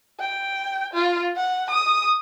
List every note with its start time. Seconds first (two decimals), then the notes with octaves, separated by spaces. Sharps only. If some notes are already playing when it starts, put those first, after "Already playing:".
0.20 G5
0.93 F4
1.36 F#5
1.71 D#6